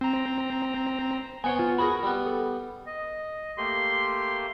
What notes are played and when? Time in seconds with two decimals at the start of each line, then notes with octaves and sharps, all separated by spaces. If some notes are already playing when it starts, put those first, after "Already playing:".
0.01 C4 A#5
1.44 B3 C5 C#5 F#5 G#5
1.59 F4
1.78 F#4 G#4 A#4 B5
2.03 G3 B3
2.26 A4
2.86 D#5
3.58 A3 A#3 G4 C6